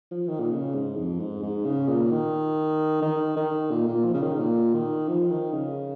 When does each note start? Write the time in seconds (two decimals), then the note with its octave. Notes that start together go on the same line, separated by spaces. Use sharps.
0.11 F3
0.28 D#3
0.40 A#2
0.51 C#3
0.74 G#2
0.97 F2
1.20 G#2
1.43 G#2
1.65 C#3
1.88 A#2
2.11 D#3
3.02 D#3
3.36 D#3
3.71 A#2
3.88 A#2
4.05 F3
4.14 C#3
4.22 D#3
4.39 A#2
4.74 D#3
5.08 F3
5.30 D#3
5.53 C#3